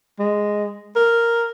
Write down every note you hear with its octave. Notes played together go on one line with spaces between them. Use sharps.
G#3
A#4